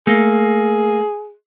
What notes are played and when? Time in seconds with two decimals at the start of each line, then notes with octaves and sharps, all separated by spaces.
0.07 A3 A#3 G#4